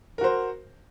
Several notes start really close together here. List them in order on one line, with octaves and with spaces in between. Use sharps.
A#4 F#4 C5